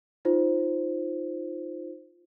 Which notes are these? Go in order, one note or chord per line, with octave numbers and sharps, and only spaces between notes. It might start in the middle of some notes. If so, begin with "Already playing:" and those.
D#4 F4 C5